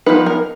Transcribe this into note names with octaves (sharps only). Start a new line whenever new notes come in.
F3 B3 D#4 B4
A#4